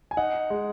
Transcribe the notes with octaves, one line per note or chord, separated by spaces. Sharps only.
G#5
D#4 F#5
G#3